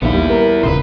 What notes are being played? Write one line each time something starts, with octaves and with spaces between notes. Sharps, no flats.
A#1 D#2 B3 E4
G3
A#4
D#1 C#2 B4 C5